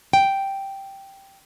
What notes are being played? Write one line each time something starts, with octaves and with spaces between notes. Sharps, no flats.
G5